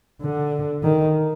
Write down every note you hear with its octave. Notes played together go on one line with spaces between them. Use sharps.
D3
D#3